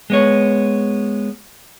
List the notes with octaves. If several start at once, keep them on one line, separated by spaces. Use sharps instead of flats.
G#3 B3 C#5